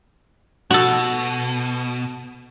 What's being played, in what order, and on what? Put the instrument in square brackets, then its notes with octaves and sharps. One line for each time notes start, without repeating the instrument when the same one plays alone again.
[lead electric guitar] B2 [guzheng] F#4 A4